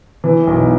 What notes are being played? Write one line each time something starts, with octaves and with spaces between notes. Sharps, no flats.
E3
B1